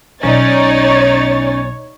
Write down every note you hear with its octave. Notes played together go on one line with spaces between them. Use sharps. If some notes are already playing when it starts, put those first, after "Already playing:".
B1 B2 C#4 D#4 C#5 D5 A6